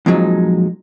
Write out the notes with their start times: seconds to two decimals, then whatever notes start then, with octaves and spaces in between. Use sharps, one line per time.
0.06 F2 A#2 F3 F#3 G#3 D#4